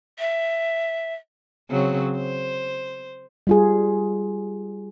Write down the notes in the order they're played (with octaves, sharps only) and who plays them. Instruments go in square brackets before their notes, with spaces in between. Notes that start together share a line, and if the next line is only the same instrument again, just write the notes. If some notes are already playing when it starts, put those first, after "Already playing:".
[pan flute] E5
[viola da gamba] C#3 F#3 C4
C5
[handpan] G3 F4 G#4